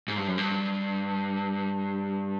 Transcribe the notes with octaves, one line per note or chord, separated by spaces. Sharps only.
G#2
G2
F#2
G2